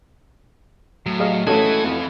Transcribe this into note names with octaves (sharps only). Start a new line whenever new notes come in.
A2 F#3
G#4 D#5 F5
C#2 E3 F#3 A3 F#4 A4 D#5 G#6
F2